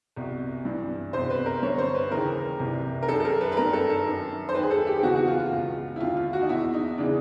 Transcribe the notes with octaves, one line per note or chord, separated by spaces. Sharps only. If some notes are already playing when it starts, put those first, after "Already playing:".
C2 B2
G2 E3
C2 B2 C5
B4
A#4
G2 D3 C#5
C5
B4
D#2 C#3 E3 A#4
C2 C3 E3
A#4
F#2 D#3 A4
A4
A#4
B4
B4
G2 D#3 A#4
A4
A4
F#2 D#3
C5
D#2 D#3 B4
G#4
A4
G4
G4
E2 C#3 E3 F#4
F#4
F4
F4
C#2 B2
E4
D#2 D3 F4
F4
F#4
D#4
E2 B2 E4
D#4
C#3 E3 D4